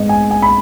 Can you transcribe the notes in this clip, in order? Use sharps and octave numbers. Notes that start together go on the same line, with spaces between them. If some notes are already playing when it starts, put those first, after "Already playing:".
Already playing: G#2 G#3 B3 D#5
G#5
G#5
B5